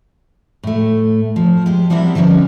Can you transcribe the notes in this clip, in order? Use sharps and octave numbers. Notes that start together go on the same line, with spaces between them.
A2 A3
F3
G#3 G4
F3 G3 B3 C4 E4 A#4
D3 F3 G3 C#4 D4